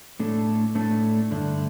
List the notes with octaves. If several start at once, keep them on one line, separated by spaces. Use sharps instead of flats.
A2 A3 D4 A4
A2 A3 D4 A4
G2 D3 A3 D4